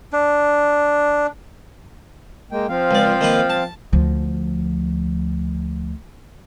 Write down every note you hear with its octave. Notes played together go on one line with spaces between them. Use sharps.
D4
G#3 A#3 G5
F3 C4 F5
C#2 D5
D#3 A#3 B4
A5
D2 F3